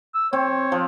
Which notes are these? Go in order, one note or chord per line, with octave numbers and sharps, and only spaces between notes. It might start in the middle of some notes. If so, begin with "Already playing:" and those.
E6
C4 C#5
F3